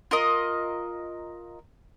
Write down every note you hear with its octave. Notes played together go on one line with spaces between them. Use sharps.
F4 A#4 D#5